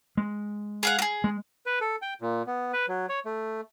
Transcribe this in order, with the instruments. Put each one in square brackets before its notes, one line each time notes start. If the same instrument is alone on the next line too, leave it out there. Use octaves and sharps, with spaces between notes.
[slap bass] G#3
[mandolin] G#4 F5 F#5
F#4 G#4
[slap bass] G#3
[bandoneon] B4
A4
G5
A#2
B3
B4
F#3
C#5
A3